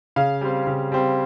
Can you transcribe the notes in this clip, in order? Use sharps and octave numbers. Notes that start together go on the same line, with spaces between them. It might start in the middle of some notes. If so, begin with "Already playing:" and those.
C#3 F5
G3 C4
C#3
G3 C4